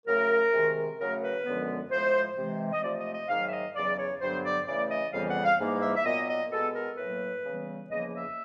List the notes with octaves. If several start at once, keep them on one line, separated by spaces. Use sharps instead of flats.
C#3 F#3 A3 A#4
C3 D#3 G#3
C#3 F#3 A3 A#4
B4
F#2 D3 F3 G#3 B3
A2 F3 G#3 C5
C3 E3 G#3
D#5
C3 F3 A3 D5
D#5
D#5
G#2 D#3 F#3 A#3 F5
E5
D#5
E2 C#3 F#3 D5
C#5
G2 D3 F#3 B3 C5
D5
C#3 E3 A3 D5
D#5
F2 C#3 E3 G3 B3 F5
F#5
F5
G#2 E3 G3 A#3
E5
E5
A#2 F#3 B3 D#5
D#5
B2 G#3 B3 A4
A#4
A2 F#3 A#3 B4
C#3 E3 G3 B3
E2 C#3 F3 A#3 D#5
E5